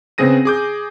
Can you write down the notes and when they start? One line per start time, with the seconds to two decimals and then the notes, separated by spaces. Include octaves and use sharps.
0.18 C#3 B3 C4 G#4 A#6 D#7
0.45 G#4 D6 G6